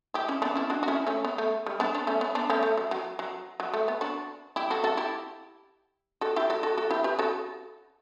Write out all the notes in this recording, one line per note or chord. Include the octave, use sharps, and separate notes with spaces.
E4 G4
C#4 E4
B3 D4
C#4 E4
D4 F#4
F#4
C#4 E4
A3 C#4
B3
A3
G3
B3 D4
B3 D4
A3 C#4
B3
B3 D4
A3 C#4
A3
F#3
F#3
F#3
F#3
A3
B3
D4 F#4
E4 G4
F#4 A4
F#4 A4
E4 G4
F#4 A4
E4 G4
F#4 A4
F#4 A4
F#4 A4
E4 G4
G4 B4
F#4 A4